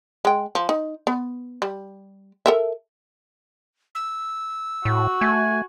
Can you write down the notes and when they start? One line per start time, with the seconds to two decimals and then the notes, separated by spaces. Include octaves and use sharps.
0.25 G#3 G5
0.55 F3
0.69 D#4
1.07 B3
1.62 G3
2.46 A4 A#4 E5
3.95 E6
4.85 A2 F#4
5.21 A3 G#5